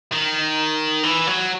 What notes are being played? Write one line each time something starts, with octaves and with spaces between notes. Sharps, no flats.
D#3
E3
F#3